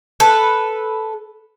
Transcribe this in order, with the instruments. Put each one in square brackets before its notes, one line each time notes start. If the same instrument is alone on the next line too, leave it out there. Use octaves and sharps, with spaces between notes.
[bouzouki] A4 B4